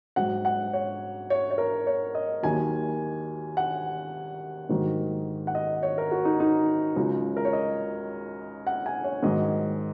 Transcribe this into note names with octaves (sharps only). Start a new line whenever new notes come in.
G#2 F#3 F#5
F#5
C#5
C#5
C#5
A#4
C#5
D#5
D#2 D#3 F#3 G#5
F#5
G#2 D#3 F#3
F#5
D#5
C#5
A#4
F#4
D#4
D#4
C#2 C#3 F#3
A#4
C#5
D#5
F#5
G#5
C#5
G#2 D#3 F#3 D#5